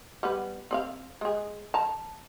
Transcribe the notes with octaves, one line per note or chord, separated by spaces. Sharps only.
G3 B3 B4
C4 D5 F5
G#3 G#4
A5 A#5